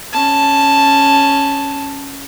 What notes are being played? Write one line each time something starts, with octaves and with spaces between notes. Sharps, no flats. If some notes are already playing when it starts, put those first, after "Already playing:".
C#4 A5